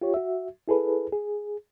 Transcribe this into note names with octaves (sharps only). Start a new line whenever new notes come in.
F4 G4 C#5
F#4 E5
E4 G#4 A4 B4
G#4